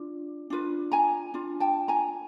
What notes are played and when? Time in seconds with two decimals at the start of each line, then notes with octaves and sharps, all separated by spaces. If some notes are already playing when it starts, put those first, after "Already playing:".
Already playing: D4 F4
0.50 D4 F4 B4
0.92 G#5 A#5
1.34 D4 F4
1.60 G5 A5
1.88 G#5 A#5